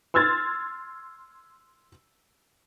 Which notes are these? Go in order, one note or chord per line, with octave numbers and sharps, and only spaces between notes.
C6 E6 F6 G#6 A6